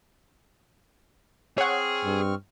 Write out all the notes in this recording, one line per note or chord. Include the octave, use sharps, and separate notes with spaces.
C4 G#4 C#5 F#5 C#6 F6
G2